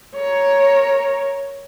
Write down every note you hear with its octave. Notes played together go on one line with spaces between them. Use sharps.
A#4 C#5